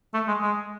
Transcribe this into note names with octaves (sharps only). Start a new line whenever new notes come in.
A3
G#3
G#3